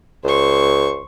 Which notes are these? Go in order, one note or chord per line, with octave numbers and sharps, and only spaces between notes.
C#2 C5 C#6